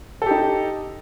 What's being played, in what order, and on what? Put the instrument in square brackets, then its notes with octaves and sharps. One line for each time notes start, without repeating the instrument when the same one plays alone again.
[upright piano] A4
G4
D#4